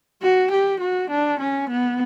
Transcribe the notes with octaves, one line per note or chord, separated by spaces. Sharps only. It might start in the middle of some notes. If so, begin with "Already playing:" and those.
F#4
G4
F#4
D4
C#4
B3